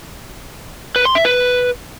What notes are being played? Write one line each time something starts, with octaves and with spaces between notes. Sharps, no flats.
B4
C6
E5
B4